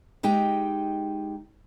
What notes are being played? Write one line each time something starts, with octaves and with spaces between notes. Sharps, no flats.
G#3 D#4 G4 G5